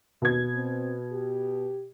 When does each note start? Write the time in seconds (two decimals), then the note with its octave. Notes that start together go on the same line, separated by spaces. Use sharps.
0.22 D#2 B2 G#6
0.54 C4
1.12 G4